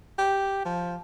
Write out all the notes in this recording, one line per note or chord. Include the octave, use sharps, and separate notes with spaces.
G4
F3